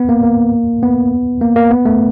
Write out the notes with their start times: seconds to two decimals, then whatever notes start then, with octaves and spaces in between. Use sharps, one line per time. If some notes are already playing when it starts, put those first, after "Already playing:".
Already playing: B3
0.09 A#3
0.23 A#3
0.83 B3
1.41 A#3
1.56 A#3
1.71 B3
1.85 A3